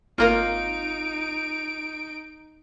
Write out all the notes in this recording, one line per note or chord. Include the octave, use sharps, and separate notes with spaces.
G#1 A#3 D#4 F4 A#4 D7